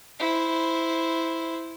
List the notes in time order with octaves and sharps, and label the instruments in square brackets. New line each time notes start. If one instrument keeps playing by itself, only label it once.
[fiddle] E4 C5